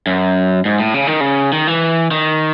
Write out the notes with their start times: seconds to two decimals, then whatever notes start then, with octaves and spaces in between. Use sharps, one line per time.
0.07 F#2
0.65 G#2
0.79 A2
0.94 C#3
1.07 D#3
1.21 C#3
1.53 D#3
1.67 E3
2.11 D#3